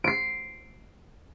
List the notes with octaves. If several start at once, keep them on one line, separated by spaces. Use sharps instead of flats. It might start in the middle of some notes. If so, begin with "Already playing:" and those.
C7 D7